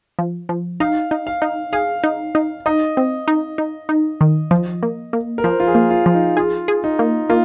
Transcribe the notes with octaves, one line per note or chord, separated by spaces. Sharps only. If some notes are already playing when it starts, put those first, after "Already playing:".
F3
F3
D#4 F5
D#4
F5
D#4
G#4 F5
D#4
D#4
D#4 D#5
C4
D#4
D#4
D#4
D#3
F3
A#3
A#3
A#4
F3 C5
F4
G#4
A#3
F4
F3
D#4
F4 G#4
G#4
D#4
A#3
A#3 F4